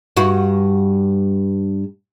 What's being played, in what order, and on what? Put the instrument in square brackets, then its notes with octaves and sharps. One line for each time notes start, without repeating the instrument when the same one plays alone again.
[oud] G2 F#4